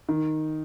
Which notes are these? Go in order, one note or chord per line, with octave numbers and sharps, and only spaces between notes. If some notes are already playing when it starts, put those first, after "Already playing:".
D#3